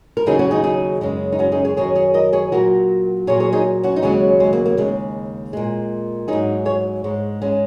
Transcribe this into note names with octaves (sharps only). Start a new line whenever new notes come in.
A#4
D#2 C#3 F#3 D#4 G#4
C#4 F#4
D#4 G#4
D#4 G#4
F#2 C#3 G#3
D#4
C#4 F#4
D#4 G#4
G#4 C#5
F#2 D#3 F#3 G#4 C#5
G#4 C#5
A#4 D#5
G#4 C#5
A#2 F#3 F#4 A#4
A#2 F#3 G#4 C#5
G#4 C#5
D#4 G#4
C#4 F#4
D#4
D#2 C#3 F#3 G#3 C#4
G#3
A#3
A#3
D#2 C#3 G#3
A#2 G#3
G#2 F#3 D#4 G#4
G#4 C#5
G#2 G#3
G#3 C#4